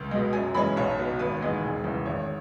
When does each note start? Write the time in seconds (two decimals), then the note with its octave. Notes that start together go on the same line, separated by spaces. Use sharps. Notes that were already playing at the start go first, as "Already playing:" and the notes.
Already playing: C#2
0.11 B2 G#3
0.33 F#2 G#5
0.55 E3 G#3 C#4 B5
0.76 B1 C#5
0.99 B2 B3
1.19 G#1 B4
1.41 G#2 E3 G#3
1.64 E1
1.84 E2 C#3
2.06 G#1 C#5